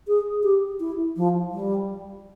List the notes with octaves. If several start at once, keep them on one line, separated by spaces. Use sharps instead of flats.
G#4
G4
E4
F3
G3